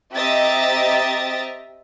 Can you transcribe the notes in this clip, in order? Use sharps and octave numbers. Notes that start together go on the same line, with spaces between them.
C4 G4 D#5 E5 A#5 A6